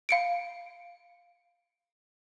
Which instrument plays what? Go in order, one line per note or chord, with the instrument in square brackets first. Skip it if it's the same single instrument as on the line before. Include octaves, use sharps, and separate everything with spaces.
[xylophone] F5 C#7 D7